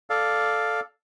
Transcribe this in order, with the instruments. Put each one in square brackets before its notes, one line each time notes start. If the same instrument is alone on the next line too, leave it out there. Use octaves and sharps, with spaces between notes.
[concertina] A4 D5 F5